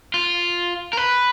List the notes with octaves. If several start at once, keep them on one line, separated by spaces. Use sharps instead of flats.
F4
A#4
B4